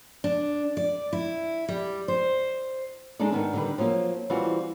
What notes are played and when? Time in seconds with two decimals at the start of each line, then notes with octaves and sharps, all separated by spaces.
0.24 D4
0.77 D5
1.13 E4
1.68 G3
2.08 C5
3.19 G#3 D4 D#4 A4 D5
3.32 G#2 D#3 B3 D4 D#4
3.53 D3 D#3 G3 D4 B4
3.78 F3 F#3 A#3 C4
4.30 E3 G3 C4 F4 F#4